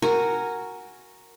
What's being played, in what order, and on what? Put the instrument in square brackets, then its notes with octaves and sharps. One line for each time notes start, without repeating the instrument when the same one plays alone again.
[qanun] F#4 A#4 G#5